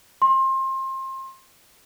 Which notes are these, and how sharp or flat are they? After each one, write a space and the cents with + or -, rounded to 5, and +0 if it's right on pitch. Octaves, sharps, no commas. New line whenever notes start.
C6 +25